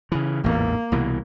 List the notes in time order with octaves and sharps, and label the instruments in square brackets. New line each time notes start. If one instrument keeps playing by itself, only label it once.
[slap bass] C#3 E3
[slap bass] A1 E2 G#2 [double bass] A#3
[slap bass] C2 B2 E3